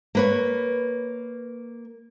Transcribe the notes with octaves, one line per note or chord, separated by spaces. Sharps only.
A#3 B4 C#5